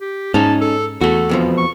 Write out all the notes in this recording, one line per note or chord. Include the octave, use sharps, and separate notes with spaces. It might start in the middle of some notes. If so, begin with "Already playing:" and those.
G4
G#2 C#4 D#4 A5
A4
E2 A3 F#4 A4
F2 B2 F3
C#6